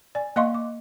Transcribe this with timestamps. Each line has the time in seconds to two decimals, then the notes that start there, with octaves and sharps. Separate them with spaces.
0.15 D5 G#5
0.36 A#3 D#5 F5 C6 C#6
0.54 D6